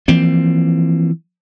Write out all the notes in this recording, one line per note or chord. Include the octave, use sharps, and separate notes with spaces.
E3 F3 A#3 C4